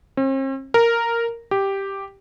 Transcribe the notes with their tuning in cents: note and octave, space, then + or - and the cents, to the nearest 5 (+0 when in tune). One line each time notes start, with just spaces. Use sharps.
C4 +45
A#4 -5
G4 +0